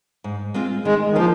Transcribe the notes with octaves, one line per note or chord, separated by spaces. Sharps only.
G#2
G#3 C4 F4
D#3 G#3
D#3
F3 A#3 D#4 C5